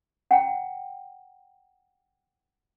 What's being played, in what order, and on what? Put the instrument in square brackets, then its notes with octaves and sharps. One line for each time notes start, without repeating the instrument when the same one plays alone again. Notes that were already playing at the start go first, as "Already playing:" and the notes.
[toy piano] F#5 G5 A#5